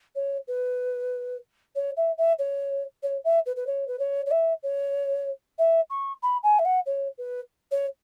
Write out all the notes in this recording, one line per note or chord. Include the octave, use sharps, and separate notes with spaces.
C#5
B4
C#5
E5
E5
C#5
C#5
E5
B4
B4
C#5
B4
C#5
C#5
E5
C#5
E5
C#6
B5
G#5
E5
F#5
C#5
B4
C#5